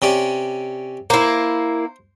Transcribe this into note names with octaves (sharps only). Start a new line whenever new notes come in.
C3 C#4 D5
A#3 E4 C5